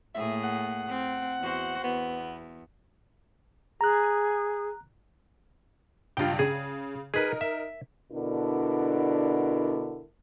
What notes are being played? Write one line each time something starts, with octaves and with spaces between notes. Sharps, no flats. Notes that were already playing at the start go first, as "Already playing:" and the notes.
A2 A#3 G#4 E5
F#5
C4
E2 F#4 C5
E2 B3
G#4 A#5 F#6
C#2 G2 F4 G5
C#3 G#4
D#4 G#4 A#4 B4
E5
B2 D3 D4 E4 A#4